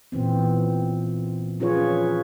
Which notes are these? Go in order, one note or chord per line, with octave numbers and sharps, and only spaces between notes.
A#2 E3 B3 C4
F3 C#4 F4 G#4 B4 C#5